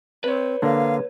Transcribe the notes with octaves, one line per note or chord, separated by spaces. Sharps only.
C4 B4 C#5
D3 A#3 D4 F5